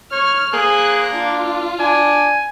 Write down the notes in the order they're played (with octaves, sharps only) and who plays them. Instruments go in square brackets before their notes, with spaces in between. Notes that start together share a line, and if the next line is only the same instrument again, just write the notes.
[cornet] C#5 [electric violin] F6
[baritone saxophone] A#3 [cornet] G#4 [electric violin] C5 F#6
[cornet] D4 [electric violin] F4
[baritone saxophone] D4 [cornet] G#5